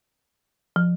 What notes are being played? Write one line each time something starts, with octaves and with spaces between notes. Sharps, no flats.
F3